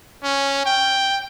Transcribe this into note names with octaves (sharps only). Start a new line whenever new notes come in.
C#4
G5